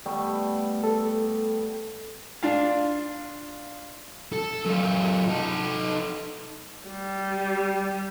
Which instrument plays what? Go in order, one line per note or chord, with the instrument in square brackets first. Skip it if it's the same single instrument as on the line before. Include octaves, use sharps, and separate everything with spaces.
[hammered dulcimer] G3 A3 B3
[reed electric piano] A4
[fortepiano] D4 F4 F5
[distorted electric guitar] A4
F#2 F4
D#4 A4
[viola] G3